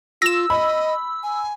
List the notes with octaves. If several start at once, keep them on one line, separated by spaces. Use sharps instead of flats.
F4 E6 A#6 E7
D#5 B5
G#5